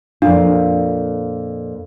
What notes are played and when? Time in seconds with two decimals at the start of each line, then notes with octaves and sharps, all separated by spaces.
0.22 F2 A#2 D4 F4